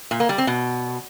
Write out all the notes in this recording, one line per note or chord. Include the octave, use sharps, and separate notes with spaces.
A#2
A#3
G3
C4
B2